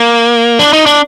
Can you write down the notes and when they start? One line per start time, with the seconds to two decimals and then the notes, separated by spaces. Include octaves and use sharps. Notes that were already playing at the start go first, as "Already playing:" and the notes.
Already playing: A#3
0.59 D4
0.73 D#4
0.86 D4